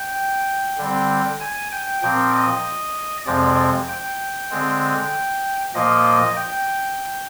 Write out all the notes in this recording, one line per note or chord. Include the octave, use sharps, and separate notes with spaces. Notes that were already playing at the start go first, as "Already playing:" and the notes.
Already playing: G5
D3 G3 C4
G#5
G5
A#2 F3 C4 G5
D#5
F2 C3 F3 G#3 C4 D5
G5
D3 G#3 C4
A#2 F3 A#3 D#5
G5